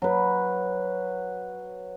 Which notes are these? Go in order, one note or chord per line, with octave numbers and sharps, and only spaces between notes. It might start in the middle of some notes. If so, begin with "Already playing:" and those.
F#3 B4